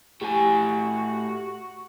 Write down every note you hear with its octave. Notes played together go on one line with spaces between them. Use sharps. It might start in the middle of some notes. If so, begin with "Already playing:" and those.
A2 F#4 G4 G#5